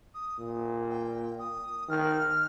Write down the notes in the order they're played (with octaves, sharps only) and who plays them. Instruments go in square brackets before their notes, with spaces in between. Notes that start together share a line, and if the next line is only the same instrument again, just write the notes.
[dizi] D#6
[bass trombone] A#2
[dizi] G5
D#6
[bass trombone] D#3 [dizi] F6